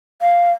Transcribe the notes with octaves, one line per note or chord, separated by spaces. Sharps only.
F5